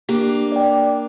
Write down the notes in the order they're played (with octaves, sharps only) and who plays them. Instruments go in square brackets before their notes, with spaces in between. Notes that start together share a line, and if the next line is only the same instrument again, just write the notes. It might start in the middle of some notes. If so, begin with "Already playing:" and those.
[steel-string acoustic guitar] A#3 D4 [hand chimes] G4
[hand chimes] D5 G5